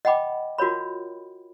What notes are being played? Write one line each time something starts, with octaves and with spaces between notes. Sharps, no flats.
D#5 F#5 G5 B5 D6
F4 F#4 A#4 C#5 B5